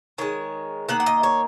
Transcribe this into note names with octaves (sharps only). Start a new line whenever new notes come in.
D#3 G#3 C#5
D#3 A#3 F#5
F#5
D#5
C#5